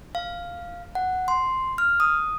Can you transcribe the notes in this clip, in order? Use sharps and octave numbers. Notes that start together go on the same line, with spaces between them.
F5
F#5
C6
F6
D#6